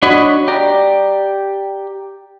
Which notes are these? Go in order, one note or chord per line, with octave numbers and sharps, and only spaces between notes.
D4 F#4 C#5 D#5 B5
G4 D5 A#5